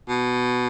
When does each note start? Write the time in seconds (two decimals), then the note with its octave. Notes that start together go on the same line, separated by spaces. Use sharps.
0.09 B2